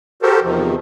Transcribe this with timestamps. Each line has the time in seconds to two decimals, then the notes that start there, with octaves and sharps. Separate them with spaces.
0.22 F#4 G4 A4 A#4 C5
0.42 E2 C3 D#3 F3